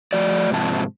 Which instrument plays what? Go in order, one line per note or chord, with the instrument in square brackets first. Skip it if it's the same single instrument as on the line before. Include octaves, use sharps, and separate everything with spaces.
[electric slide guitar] F3 A3 F#4 D5
G#2 C3 F3 A5